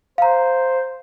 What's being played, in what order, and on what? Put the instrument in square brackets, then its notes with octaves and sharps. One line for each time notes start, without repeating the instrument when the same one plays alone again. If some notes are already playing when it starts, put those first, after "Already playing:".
[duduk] C5 [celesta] F5 A#5